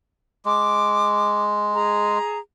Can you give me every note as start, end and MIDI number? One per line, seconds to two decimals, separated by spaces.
0.45 2.18 56
0.45 1.40 86
1.73 2.39 68
1.73 2.39 82